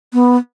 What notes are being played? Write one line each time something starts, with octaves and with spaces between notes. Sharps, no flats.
B3